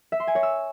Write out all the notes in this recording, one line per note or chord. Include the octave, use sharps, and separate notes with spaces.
E5
C6
G#5
C#5
E6